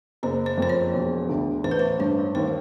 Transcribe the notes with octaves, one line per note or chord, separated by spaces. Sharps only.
F#1 C5
C5
F2 C5
C#5
E1
D2
A1 C5
B4
C5
G2 C#5
D#2 C5